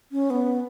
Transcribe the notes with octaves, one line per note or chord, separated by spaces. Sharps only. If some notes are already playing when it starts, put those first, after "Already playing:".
C#4
B3